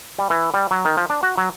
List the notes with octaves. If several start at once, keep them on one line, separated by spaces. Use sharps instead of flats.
G3
E3
G3
F#3
D#3
F3
D4
F#4
F#3